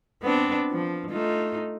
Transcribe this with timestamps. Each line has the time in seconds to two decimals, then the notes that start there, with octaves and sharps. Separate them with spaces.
0.23 B3 C4 D4
0.72 F3
1.11 A3 D#4 F4